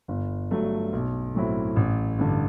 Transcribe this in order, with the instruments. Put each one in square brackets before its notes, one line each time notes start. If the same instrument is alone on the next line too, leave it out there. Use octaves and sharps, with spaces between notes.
[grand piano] G1
G2 F#3 A3
B1
A2 F#3 C4 E4
A1
G2 D3